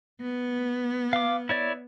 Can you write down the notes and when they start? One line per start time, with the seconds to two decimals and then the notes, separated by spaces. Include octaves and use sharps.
0.20 B3
1.13 F5 D6
1.49 E4 C#5 D5